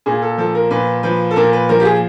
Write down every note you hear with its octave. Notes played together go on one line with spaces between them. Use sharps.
A#2 G#4
A4
F3 A4
A#4
A#2 B4
F3 B4
A4
A#2 A#4
B4
F3 A#4
G4
G#4